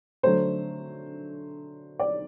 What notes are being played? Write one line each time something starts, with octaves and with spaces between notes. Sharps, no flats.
D3 F#3 A3 C5
D5